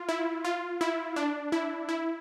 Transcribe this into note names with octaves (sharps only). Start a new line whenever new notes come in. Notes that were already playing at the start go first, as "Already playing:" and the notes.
Already playing: F4
E4
F4
E4
D4
E4
E4